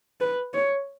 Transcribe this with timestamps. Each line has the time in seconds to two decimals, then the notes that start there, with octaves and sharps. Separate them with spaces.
0.21 B4
0.54 C#5